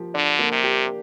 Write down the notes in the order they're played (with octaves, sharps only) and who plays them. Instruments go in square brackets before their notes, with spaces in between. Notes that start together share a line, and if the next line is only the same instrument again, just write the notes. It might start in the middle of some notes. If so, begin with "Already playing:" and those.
Already playing: [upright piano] F3 A#3 G4
[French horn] D3 [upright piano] D4
[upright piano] A#3
[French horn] C3
[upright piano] G4